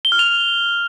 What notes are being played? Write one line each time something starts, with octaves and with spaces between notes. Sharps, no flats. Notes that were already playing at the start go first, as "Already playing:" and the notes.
G7
F6
F7